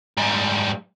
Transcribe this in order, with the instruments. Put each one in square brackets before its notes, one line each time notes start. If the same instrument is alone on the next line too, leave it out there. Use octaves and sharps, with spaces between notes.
[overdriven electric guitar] G#2 G3